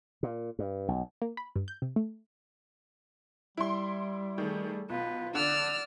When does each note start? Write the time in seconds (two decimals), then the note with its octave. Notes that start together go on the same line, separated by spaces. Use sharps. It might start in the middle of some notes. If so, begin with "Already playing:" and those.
0.23 A#2
0.59 G2
0.88 B1
1.22 A#3
1.37 B5
1.56 G2
1.68 G6
1.82 C3
1.96 A3
3.57 G3 E4 C6
4.38 D#3 A3 G#4
4.90 B1 F4 B4
5.35 D3 D5 E6 F6